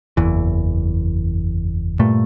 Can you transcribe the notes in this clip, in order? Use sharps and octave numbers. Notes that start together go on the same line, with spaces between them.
F#1 E2 E3
G2 A#2 A3